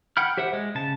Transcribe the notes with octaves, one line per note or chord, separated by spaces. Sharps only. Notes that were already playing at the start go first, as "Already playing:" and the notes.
F#5 G5 B5 F6
G4 C5 E5 F#5
G#3
C#3 A5